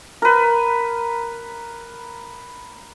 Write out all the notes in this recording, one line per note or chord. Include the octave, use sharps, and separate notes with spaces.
A#4 B4